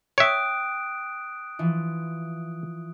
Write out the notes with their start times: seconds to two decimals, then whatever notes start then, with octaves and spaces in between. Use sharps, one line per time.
0.18 C#5 E5 G5 D#6 F#6 D7
1.59 E3 F3